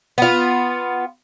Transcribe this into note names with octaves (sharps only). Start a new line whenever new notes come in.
B3 F4